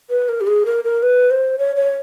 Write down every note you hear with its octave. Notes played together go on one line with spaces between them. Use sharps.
B4
A#4
G4
G#4
A#4
A#4
B4
C5
C#5
C#5